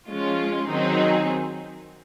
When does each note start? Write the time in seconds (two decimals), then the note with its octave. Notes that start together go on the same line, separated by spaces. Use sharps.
0.08 F3 G#3 C#4 F4
0.68 D#3 F#3 C4 D#4 G#4